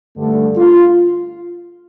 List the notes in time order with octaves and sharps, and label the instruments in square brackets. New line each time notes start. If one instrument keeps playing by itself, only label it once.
[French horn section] G2 D3 A3
F4